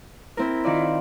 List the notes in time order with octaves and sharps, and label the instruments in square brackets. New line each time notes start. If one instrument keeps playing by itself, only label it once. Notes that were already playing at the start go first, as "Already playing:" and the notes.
[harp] C4 A#4 [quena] E4
[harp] D#3 F4 D5